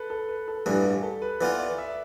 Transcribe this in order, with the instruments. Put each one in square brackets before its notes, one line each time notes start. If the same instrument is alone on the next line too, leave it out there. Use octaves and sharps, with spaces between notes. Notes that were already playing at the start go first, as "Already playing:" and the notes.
Already playing: [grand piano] A4 B4
A4
B4
A4
[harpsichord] A1 G2 E3 [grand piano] A4
[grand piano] G4
A4
B4
[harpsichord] E3 B3 F4 [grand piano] D5
[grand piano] D5
E5